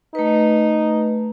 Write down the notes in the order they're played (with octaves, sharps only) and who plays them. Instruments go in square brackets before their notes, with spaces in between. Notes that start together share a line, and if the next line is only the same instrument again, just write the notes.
[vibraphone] A3 B4 [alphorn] D#4